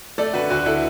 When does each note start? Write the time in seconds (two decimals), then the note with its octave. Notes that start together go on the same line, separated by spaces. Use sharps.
0.18 A3 A4 D5
0.34 D3 F#4 B4
0.50 D2 F#4 B4
0.66 E4 A4